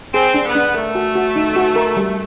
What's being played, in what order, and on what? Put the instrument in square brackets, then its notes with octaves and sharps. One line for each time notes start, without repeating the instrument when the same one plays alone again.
[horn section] C4 [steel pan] G#4
[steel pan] D4
[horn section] B3
[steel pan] D4
[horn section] A3 [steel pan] A#4
[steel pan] F#4
F#4
D#4
F#4
A#4
G3